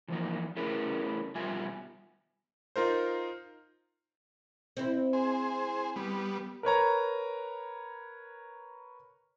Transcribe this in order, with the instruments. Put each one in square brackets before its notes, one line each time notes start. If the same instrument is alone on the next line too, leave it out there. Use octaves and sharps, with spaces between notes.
[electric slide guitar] E3 F3 A#3 D#4
A3 C#4 E4 G#4 A#4 B4
B2 D#3 G3 F4 E5 G#5
[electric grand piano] D#4 F4 A#4 C5
[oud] C4 E4
[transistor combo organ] G#4 C5
G3 B3
[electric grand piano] A#4 B4 C#5 A#5